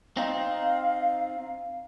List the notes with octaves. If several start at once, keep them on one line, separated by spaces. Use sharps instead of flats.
C4 D#4 F5